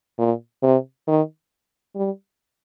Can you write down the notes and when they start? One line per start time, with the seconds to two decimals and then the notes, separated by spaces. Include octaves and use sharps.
0.19 A#2
0.63 C3
1.07 D#3
1.96 G3